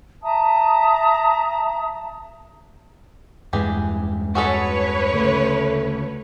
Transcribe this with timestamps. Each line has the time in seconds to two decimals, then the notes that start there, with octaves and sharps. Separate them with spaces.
0.22 E5 A5 A#5 D#6
3.53 E2 G2 E3 G#3 G4 G#4
4.35 F#4 G#4 A4 B4 C#5
5.13 D2 C#3 A3